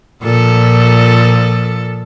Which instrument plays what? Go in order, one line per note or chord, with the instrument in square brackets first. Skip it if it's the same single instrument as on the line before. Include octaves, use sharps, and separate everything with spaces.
[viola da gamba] A#2 F3 A4